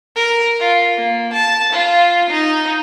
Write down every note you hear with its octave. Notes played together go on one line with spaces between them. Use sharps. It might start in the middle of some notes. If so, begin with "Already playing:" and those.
A#4
F4
A#3
A5
F4
D#4